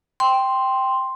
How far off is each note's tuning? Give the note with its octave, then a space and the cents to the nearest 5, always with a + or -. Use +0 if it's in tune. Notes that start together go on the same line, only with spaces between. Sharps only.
G5 +0 C6 +0